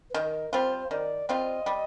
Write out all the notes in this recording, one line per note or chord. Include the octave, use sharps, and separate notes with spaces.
B4
D#3 A#4
G3 C4 F4 C5
D#3 D5
G3 C4 F4 D#5
G3